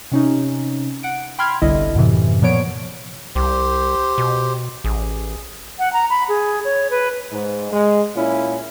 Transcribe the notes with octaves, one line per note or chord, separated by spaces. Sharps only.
C3 C#4 D#4
F#5 D7
G5 B5 C6 F6 G#6
G1 C2 D3 E4 D#5
F#2 A2 C3 E3
A#2 F3 B3 C#5 D7
C2 G4 C5
B2
A1 G#4
F#5
A#5
B5
G#4
C#5
B4
G#2
G#3
A#2 C#4 E4